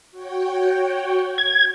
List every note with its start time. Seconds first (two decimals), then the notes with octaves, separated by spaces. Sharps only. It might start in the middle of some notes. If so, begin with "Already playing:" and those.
0.11 F#4 C#5 G5
1.38 G#6